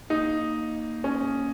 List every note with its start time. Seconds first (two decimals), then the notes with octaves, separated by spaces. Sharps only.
0.10 A#3 D#4
1.04 C#4